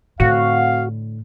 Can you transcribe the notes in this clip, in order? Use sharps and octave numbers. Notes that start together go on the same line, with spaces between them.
A2 D3 C4 F#4 F5